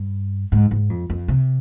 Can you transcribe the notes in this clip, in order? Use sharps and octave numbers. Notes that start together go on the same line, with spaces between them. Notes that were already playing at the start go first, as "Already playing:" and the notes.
Already playing: G2
G#2
G#2
F2
F2
C3